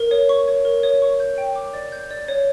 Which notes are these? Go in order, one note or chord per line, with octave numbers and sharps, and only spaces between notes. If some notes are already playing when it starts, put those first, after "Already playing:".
Already playing: A#4
C#5
C#6
C#5
A#4
C#5
C#6
G6
G5
D6
D5
G6
D5
C#5